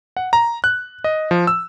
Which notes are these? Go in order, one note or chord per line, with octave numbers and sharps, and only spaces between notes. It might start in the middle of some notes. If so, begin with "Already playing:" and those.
F#5
A#5
F#6
D#5
F3
E6